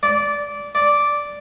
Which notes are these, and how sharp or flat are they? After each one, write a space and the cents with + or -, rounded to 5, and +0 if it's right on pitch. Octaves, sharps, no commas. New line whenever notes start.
D5 -15
D5 -5